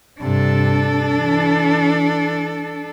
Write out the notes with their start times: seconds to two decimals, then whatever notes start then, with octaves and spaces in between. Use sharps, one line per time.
0.21 G2 C3 D4 A4
1.16 E3